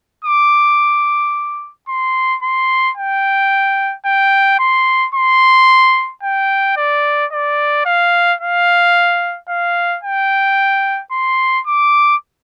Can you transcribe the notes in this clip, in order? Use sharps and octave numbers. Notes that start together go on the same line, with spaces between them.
D6
C6
C6
G5
G5
C6
C6
G5
D5
D5
F5
F5
F5
G5
C6
D6